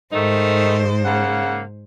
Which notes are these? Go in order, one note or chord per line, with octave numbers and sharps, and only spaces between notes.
G#2 D#3 A3 D#4 C5
C#3 A#3 F#5